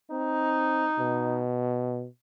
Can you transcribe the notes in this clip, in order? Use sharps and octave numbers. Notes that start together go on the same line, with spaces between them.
C4 D#4
B2